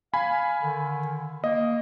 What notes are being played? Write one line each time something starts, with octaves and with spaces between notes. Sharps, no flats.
F5 G#5 B5
D3 D#3
A#3 D#5